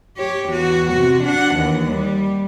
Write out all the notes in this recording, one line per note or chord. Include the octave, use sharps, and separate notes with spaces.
G4 C#5
E2 F#4
C3 F#4
D4 F#5
D#2 E3
G3